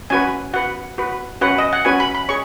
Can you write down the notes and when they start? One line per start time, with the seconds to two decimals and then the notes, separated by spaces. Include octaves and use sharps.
0.10 C#4 F#4 B4 G#5
0.53 F#4 B4 F#5
0.98 F#4 B4
1.41 C#4 F#4 B4 F#5
1.58 D#5
1.73 F#5
1.85 C#4 F#4 B4 G#5
2.00 B5
2.15 B5
2.29 G#4 C#5 C#6